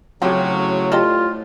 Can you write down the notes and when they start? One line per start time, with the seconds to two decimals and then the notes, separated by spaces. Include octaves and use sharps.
0.22 A2 C#3 F3 F#3 C4 F4 G4
0.92 G3 F4 A4 D#5